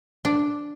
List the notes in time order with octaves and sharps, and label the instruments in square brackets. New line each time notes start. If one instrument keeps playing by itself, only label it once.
[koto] D4